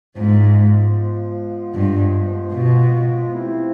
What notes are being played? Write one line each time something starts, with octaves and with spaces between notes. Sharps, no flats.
G#2 F3 G#3 B3
G2
B2
C3 F3 A3 C4 E4